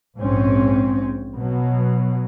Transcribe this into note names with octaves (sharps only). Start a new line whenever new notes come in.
A#1 G#2 C4 C#4
B2 F#3